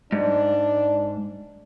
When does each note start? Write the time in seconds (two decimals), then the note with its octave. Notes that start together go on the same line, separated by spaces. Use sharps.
0.12 G#2 D4